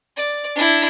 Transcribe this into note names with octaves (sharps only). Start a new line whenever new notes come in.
D5
D4 E4